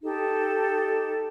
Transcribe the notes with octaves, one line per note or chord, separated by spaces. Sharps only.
D#4 G4 A4